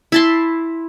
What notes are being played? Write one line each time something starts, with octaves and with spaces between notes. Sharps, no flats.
E4 A5 C6